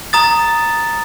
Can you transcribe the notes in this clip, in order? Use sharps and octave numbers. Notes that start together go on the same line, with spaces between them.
A#5 D#6 A6